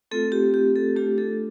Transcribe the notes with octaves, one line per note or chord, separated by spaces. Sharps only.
A3 C4 F4 A4
G4
G4
A4
A3 D4 F4 G4
A4